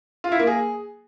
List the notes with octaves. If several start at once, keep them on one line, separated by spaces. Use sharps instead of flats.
F4
E4
A#3
G#4